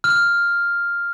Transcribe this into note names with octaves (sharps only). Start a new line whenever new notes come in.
F6